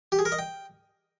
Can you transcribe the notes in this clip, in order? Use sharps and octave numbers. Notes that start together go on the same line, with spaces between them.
G4
G#4
A#4
D#5
G5